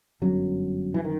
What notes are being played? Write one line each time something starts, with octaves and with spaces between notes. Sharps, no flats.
G1 F#2 F#3
E3
D#3